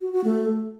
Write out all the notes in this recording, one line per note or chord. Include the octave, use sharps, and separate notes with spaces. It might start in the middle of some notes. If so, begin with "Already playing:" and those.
F#4
F#4
A3